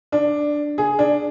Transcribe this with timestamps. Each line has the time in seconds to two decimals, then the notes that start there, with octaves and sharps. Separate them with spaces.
0.12 D4
0.78 G#4
0.99 D4